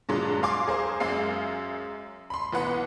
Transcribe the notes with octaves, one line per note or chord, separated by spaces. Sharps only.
G2 A#2 D3 F#3 G#3
F5 G#5 C6 D6
G#4 A#4 C5
F#2 G#3 F5 C7
B5 C6
B1 E3 B3 F#5 B5